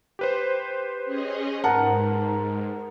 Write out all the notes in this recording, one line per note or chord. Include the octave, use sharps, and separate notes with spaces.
G4 B4 C5
C#4 G#4 D#5
G#2 A#4 F#5 A5